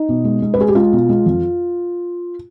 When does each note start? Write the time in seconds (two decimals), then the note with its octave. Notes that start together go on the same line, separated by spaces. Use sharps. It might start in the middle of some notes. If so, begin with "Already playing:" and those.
Already playing: D#4
0.09 B2
0.25 G#3
0.42 G#3
0.54 B4
0.58 G#3 G#4
0.68 G4
0.75 G#3 F4
0.93 B2
1.09 G#3
1.26 F2